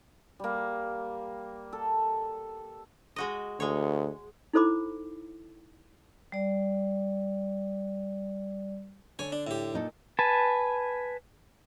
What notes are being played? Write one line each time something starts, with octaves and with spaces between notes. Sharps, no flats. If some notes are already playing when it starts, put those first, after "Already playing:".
G3 A#3
A4
G#3 F#4 D#5
D2 G#3 C#5
D#4 E4 A4 C5 B5 D6
G3 D5
D3 C#5 G#5
D4
A2 G4
A#2 D#4 A4
B4 G#5 A5